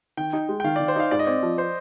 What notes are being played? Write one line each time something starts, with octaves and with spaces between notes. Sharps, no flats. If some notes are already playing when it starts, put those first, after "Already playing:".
D#3 G5
D#4
G#3
G5
D#3 F5
D5
D#3
C5
D#4 F5
G#2 D5
D#5
C4 D5
F3
C5